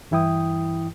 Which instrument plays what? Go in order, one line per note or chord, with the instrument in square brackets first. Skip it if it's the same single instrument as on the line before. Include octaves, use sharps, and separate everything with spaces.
[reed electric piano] G2 E3 E4 G5 D#6